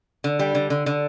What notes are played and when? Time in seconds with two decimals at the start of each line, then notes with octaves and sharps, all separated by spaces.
0.24 D3
0.39 G3
0.55 D3
0.70 D3
0.86 D3